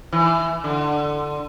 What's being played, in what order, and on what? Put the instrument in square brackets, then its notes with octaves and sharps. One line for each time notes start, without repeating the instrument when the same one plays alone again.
[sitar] E3
D3